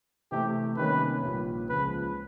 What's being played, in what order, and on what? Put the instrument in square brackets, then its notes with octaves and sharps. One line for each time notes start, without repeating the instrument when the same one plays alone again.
[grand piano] C3 E3 A3 C4 [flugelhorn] G4
[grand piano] C3 D#3 G3 A#3 C#4 [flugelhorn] B4
[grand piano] A#1 A#2 G3
[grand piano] C#2 C#3 F3 [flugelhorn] B4